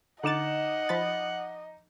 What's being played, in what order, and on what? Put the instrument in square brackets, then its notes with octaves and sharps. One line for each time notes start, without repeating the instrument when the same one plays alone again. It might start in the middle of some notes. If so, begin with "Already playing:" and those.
[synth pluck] D3 A6 [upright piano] D#4 D6 E7 [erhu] D#5 [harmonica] F#5
[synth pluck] F3 B5 A6